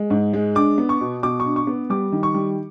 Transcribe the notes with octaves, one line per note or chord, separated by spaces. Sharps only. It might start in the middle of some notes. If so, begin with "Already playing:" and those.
Already playing: G#3
G#2
G#3
D4 D6
B3
C#6
B2
B2 D6
D4 C#6
C#6
B3
G3 D6
D#3
C#6
G3